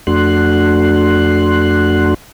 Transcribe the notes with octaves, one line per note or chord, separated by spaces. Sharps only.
F2 A3 D4 F#4 C6 F#6